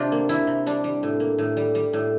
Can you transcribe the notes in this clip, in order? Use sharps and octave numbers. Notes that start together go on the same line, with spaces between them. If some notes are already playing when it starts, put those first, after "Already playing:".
Already playing: C3 D4 F4 G4
A#3
A#3 E4
C3
G3 D4
G3
A2
A#3
A2
G3
G3
A2